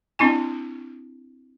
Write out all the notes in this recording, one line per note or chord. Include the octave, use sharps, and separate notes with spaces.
C4 D4 E4 G#5